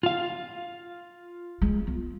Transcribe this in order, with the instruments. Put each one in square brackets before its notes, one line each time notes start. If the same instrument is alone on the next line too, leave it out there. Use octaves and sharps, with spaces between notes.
[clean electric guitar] F4 F5
[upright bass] G#3
B3